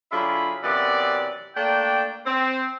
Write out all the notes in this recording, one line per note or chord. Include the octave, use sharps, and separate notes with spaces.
D3 F#3 E4 F4 G#4 B5
F#2 C3 E3 B3 D5
A3 A#3 D4 G5
C4